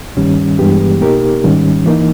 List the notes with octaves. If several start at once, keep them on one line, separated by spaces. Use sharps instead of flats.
G2 D#3 G3 C#4
G2 E3 G#3 B3 G4
B2 A#3 D#4 G4 A#4
G#2 D#3 G3 C#4
E3 A#3 D#4